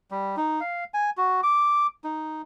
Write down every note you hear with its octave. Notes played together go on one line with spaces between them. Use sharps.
G3
D#4
F5
G#5
F#4
D6
D#4